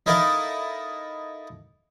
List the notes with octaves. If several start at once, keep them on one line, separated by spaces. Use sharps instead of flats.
D#4 E4 A4 A#4 D#5 F5